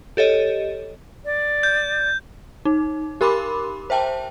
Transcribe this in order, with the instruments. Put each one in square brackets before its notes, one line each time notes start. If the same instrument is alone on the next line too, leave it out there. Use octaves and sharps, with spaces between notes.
[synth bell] G4 A4 C#5 D#5
[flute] D5
[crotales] G6
[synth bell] D#4
G4 A#4 B5 C6 D6
C5 E5 G5 A5